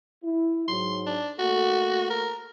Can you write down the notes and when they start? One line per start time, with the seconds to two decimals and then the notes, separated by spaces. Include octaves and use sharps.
0.24 E4
0.68 G#2 F#3 C6
1.07 D4
1.39 A3 A#3 F#4 A4
2.10 A#4